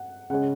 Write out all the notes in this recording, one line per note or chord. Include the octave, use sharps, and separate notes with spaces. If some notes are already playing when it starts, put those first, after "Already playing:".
Already playing: F#5
C#3 G#3 C#4 F#5